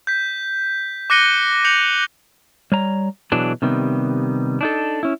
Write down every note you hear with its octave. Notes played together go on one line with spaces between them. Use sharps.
G6 B6
D6 F#6 A#6 C#7 D#7 G7
G6 C#7 F7 F#7
G3 C#5 A#5
B2 E3 F#3 D4 G#4
C3 D#3 G3 B3
D4 D#4 A4
C#4 E4